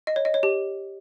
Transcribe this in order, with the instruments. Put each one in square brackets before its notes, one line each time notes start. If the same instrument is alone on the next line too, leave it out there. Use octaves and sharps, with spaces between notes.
[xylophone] D#5
C#5
D#5
C#5
G4